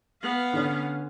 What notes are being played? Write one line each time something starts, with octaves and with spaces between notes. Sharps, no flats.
B3 F5
D3 C#4